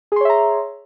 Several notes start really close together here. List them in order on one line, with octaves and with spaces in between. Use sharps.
G#4 C6 C#5 E5 A#5